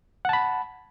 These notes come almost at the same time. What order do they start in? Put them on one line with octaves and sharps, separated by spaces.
F#5 A5 B5